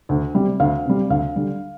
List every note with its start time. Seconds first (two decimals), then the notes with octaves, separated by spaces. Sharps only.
0.09 D2
0.35 C3 G3
0.60 D2 F5
0.85 C3 G3
1.10 D2 F5
1.36 D3 G3